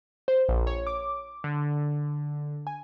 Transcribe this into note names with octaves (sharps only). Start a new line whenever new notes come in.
C5
A#1
C#5
D6
D3
G#5